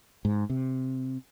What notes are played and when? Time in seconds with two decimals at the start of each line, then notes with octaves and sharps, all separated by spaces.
0.25 G#2
0.50 C3